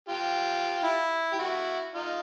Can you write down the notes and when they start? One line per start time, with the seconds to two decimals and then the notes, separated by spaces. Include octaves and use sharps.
0.09 F4 G4
0.83 E4
1.32 G4
1.39 E4 F#4
1.95 D#4 F4